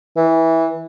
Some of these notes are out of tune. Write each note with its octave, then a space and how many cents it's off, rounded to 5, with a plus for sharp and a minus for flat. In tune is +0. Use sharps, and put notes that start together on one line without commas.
E3 -15